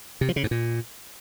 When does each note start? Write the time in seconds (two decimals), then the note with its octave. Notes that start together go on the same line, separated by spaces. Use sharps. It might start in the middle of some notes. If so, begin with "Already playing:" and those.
0.21 C3
0.29 F3
0.36 C#3
0.44 G#2
0.51 A#2